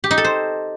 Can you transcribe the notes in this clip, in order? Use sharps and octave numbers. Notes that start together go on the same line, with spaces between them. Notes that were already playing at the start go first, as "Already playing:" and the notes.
G4
D#4
A4
C5